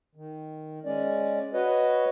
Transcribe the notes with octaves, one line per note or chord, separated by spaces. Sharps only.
D#3
G#3 C#4 D5
F#4 B4 C#5 D#5